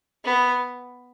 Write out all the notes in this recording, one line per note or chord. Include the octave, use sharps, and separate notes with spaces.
B3